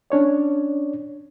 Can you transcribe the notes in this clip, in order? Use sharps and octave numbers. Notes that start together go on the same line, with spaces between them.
C#4 D4 C#5 D5